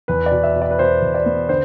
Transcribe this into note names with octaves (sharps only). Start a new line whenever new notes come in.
E2 B4
D5
B2
E5
B2
D5
B4
B2 C5
E2
D5
B3
D3 C5